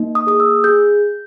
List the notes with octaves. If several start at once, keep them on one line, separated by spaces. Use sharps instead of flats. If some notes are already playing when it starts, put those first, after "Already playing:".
Already playing: A#3 D#4
D#6
G#4 D#6
E6
G#4 G6